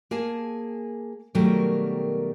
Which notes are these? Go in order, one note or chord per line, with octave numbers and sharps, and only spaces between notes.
A#3 G#4 G#5 A5
B2 D#3 F#3 G3 A3 A#4